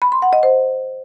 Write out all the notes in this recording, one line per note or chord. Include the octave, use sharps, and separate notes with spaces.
B5
C6
F#5
D#5
C5